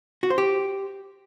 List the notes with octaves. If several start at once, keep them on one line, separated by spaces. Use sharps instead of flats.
F#4
C5
G4